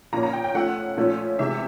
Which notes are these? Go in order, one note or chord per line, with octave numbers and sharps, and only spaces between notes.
A#2 F3 A#3 C#4 A#5
A#5
G5
G5
F3 A3 C#4 F#5
A#2 F3 A3 C#4
C3 E3 G#3 E5